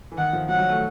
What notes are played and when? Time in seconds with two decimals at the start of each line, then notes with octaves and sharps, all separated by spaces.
0.12 E3
0.17 D#3 F#5
0.33 F3
0.49 F#3 F#5
0.59 F#3
0.69 A3